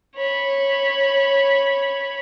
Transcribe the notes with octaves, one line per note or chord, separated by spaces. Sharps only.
C#5 B5